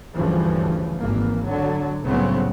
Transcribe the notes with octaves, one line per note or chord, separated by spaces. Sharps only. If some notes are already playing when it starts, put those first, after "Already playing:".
D2 G2 C#3 E3 F3
G#1 E3 A#3
D3 F#3
C2 A2 C#3 F#3 B3 C4